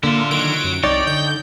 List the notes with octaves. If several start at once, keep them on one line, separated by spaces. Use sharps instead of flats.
D3 A#3 E4 F4 A4
D#3 F#3 D7
F#2
C2 D#4 C#5 D5 G5
D3 G6